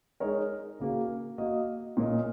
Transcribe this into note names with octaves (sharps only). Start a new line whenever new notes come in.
G#3 D#4 A#4 C#5
C#3 A#3 F#4 A#4
A#3 F#4 D#5
A#2 A#3 C#4 A#4 D#5